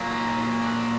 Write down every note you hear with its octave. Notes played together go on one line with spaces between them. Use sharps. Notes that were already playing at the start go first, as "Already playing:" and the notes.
Already playing: A#2 F#3 A#3
D#4
D4